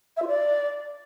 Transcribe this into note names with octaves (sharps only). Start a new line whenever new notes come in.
E5
F4
D5